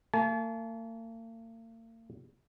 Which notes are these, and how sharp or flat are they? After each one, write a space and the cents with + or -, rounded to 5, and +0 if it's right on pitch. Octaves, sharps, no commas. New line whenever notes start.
A#3 -45 A5 -40